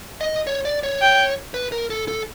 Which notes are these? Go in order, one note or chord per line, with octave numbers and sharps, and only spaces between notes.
D#5
C#5
D5
C#5
G5
B4
A#4
A4
A4